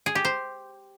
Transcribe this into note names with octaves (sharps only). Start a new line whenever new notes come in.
G#4
G4
C5